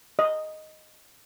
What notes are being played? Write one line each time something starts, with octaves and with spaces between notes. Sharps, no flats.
D#5